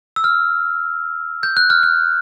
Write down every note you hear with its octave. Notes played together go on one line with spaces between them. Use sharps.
E6
F6
G6
F#6
F6
F#6